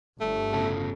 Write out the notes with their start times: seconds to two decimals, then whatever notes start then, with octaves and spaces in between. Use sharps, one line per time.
0.21 G1 A3
0.53 A2 C#3 A4